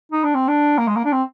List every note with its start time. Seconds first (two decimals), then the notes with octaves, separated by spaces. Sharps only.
0.12 D#4
0.24 D4
0.35 C4
0.48 D4
0.78 A#3
0.88 G#3
0.96 A#3
1.05 D4
1.13 C4